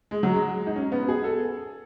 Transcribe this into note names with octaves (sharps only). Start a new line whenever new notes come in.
G#3
F#3
G#3
D#4
C#4
B3
G#4
A4